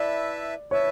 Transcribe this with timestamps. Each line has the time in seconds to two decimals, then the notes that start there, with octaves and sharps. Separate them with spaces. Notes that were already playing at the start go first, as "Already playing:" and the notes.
Already playing: E4 B4 D5 E5 A5
0.71 E4 B4 C#5 E5 A5